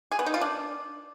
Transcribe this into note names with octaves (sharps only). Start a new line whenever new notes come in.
G#4
B3
D#4
F4
D4